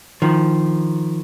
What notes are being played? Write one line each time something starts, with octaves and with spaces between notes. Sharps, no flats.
D#3 F3